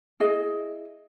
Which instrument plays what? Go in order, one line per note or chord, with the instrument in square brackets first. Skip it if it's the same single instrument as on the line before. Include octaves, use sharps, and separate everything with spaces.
[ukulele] E4 G#4 D#5